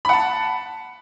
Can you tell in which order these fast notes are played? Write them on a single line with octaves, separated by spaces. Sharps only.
B5 F#5 A5